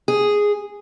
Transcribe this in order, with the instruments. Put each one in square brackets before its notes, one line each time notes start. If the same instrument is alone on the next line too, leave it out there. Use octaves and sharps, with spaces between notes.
[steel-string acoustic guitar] G#4